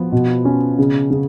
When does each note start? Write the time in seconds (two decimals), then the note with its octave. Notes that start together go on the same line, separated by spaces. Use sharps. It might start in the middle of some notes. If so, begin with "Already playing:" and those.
Already playing: F3 B3
0.12 B2
0.45 C#4
0.79 C#3
1.10 C#3